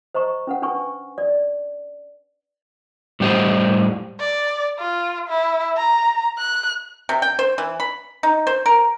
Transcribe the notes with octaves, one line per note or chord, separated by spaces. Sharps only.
C5 D#5 A#5 C#6
C#4 B4 F#5
D4 B4 G#5 C#6
D5
A2 G3 G4 C5 D#5
D5
F4
E4
A#5
F#6
C3
G5
C5
E3
B5
D#4
C5
A#4